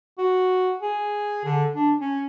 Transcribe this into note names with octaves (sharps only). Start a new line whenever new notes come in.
F#4
G#4
D3
D4
C#4